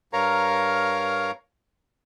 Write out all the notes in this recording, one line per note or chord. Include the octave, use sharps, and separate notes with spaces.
G2 A#4 C#5 F5 A#5